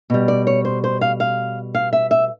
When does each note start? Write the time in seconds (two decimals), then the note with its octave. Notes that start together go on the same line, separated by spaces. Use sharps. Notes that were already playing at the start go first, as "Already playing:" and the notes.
0.10 B2 G3
0.28 D5
0.47 C#5
0.65 C5
0.84 C5
1.01 F5
1.20 F5
1.75 F5
1.93 E5
2.11 E5